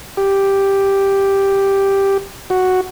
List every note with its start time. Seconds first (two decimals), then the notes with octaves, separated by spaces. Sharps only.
0.17 G4
2.50 F#4